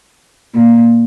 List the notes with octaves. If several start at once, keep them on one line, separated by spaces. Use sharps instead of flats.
A#2